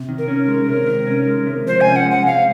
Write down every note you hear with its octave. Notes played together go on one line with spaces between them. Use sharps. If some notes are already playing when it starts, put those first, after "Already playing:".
Already playing: C3
D#3
A#4
C#4
G#3
C3
D#3
C#4
G#3
C3
F3 C5
G#5
C#4
F#5
G#3
F#5
C3 F5